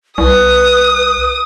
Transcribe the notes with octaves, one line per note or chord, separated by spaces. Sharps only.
C2 B4 D#6